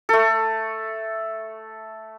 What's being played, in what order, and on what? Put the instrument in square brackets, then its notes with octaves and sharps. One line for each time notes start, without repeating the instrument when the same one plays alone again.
[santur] A3 A4